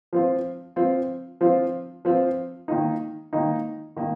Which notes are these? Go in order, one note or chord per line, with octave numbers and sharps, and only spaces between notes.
F3 C4 F4
F3 C4 F4
F3 C4 F4
F3 C4 F4
D#3 A#3 D#4
D#3 A#3 D#4
D#3 A#3 D#4